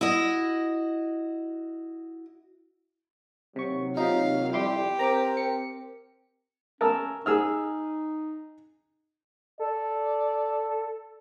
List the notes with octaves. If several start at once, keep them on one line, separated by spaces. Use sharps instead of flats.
E4 F#4 D#5
D#2 C3 F#3 C#6
C3 D#4 F4 F5
F2 G3 E4 G4 C6 D6
C4 A#4 C5 A#5 D6
C#7
C#4 A#4 A5 E6
D#4 G#4 E6 F6
A4 D5